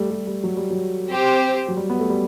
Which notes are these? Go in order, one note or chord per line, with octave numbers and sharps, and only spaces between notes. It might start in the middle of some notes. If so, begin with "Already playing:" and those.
Already playing: G3 A3
G3
G3
F#3
G3
F#3
C4 G4 C5
F#3
G3
B3
A3
G3